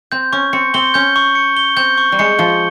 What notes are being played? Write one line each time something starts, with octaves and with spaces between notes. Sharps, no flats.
C4 G6
C#4 C#6
C4 C#7
C4 G7
C#4 G6
C#6
C#7
G7
C4 G6
C#6
G3
G#3 C#7
F3 G7